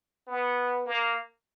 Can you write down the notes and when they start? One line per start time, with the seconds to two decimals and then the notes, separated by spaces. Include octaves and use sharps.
0.28 B3
0.86 A#3